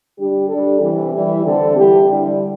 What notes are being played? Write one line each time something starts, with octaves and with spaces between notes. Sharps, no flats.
D3 G3 D4 G4
G3 D4 A4
C3 E3 G3
E3 G3 E4
D3 C4 A4
E3 G3 E4 G4
D3 G3 E4